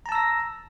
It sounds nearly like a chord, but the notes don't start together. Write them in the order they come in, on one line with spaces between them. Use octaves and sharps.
A#5 A5 E6 A#6